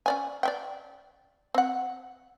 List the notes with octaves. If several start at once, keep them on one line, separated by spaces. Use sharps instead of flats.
C#4 D5 G#5
D5 E5 G5
C4 F#5